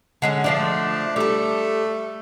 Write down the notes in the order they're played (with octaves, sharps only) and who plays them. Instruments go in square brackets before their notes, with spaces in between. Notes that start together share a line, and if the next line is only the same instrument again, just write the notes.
[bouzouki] D3 G#3 C#4
[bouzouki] D3 F3 A3 [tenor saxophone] D4
[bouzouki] G3 A4 [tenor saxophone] A3